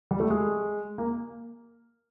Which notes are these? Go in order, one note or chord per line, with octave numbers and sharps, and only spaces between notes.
G3
A3
G#3
A#3